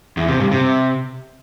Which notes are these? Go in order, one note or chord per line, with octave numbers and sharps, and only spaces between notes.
E2
C3
G2
C3